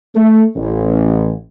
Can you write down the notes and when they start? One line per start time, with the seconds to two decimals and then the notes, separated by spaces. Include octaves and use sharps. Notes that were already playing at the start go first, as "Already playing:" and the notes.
0.15 A3
0.56 A1